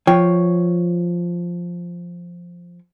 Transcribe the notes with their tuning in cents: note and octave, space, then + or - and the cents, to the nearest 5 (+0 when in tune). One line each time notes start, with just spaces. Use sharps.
F3 +0 C#5 +0 G5 +0